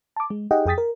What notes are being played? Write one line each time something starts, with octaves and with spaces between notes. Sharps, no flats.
A5 D6
G#3
D#4 G4 G#4 D#5 F#5 G5
F2 G#4 G5 D#6 A6 B6
A#4